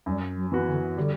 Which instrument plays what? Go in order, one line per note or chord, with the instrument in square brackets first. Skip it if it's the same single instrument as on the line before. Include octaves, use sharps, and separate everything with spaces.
[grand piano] F#2 [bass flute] G3
[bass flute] F#3
[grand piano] E3 B3 F#4 B4
[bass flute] D3
[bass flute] D3 [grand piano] G3